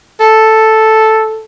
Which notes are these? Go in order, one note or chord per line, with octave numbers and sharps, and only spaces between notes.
A4